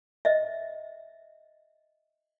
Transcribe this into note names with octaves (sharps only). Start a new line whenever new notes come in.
D#5 E5